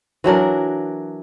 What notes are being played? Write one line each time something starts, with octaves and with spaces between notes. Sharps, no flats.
E3 F#3 D4 A#4